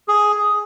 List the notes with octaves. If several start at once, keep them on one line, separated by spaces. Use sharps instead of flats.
G#4